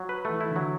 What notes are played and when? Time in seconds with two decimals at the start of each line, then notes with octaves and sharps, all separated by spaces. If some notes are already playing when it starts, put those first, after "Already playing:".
Already playing: F#3
0.09 B4
0.25 E3 A3
0.41 E4
0.51 D3 F#3